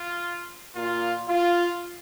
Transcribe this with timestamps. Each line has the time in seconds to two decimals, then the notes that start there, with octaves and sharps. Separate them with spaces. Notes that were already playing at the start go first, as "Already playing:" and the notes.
Already playing: F4
0.75 A#2 A#3 F4
1.28 F4